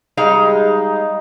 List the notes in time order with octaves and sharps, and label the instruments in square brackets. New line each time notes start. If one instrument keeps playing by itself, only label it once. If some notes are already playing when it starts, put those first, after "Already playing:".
[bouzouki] G3 G#3 F5 [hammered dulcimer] D#4